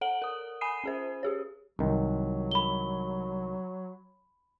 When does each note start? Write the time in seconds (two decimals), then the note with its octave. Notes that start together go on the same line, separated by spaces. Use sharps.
0.01 A4 F#5 D7 F#7 G7
0.22 A#4 D#6
0.61 G#5 B5 D#6 C7 D#7
0.84 C#4 G#4 C5
1.23 G4 G#4 C#5
1.79 C2 D#3 F#3
2.51 B5 G7